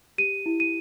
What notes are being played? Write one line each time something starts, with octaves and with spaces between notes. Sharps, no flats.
G4 D#7
E4
D#7